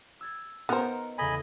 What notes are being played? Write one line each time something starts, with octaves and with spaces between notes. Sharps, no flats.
E6 G#6 A6
B3 D#4 F4 A#4 C5
E2 C#3 A4 D#5 G#5 B5